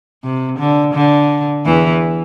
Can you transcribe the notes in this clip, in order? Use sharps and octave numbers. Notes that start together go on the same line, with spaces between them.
C3
D3
D3
E2 E3